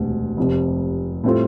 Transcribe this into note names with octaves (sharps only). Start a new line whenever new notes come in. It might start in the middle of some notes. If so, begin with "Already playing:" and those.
Already playing: E1 D2 C3
F1 F2 C3
A2 G3 C4 F4 A4